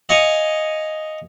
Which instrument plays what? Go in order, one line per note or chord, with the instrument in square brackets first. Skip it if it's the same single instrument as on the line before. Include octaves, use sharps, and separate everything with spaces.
[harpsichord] D#5 F5 G#5 C#6 D#6